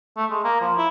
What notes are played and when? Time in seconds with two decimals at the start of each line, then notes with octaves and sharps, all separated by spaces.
0.17 A3
0.31 G#3
0.44 A#3
0.61 F3
0.77 E4